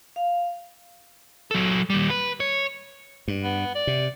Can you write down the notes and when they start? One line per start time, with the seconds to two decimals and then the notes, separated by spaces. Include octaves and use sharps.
0.16 F5
1.51 F#3 A4
1.90 D#2 G3
2.10 B4
2.40 C#5
3.28 G2
3.42 B3
3.75 D5
3.87 C3